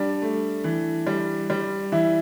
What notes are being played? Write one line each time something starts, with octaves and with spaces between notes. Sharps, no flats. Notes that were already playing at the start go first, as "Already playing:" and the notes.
Already playing: G3 D4
A3
E3
G3
G3
E3 E4